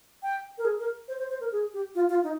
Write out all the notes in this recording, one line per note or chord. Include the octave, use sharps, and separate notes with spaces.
G5
A#4
G#4
A#4
C5
C5
C5
A#4
G#4
G4
F4
F4
D#4